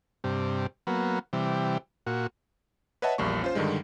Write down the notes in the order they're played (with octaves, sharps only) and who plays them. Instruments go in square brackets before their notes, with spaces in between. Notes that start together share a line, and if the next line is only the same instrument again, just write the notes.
[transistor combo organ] G2 C3
F#3 A#3 B3
C3 E3 G3
A#2 F#4
[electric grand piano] B4 C#5 D#5 E5 F#5 A5
A#1 E2 G3 A#3 C#6
C#4 F4 C5
G2 D3 D#3 G3 G#3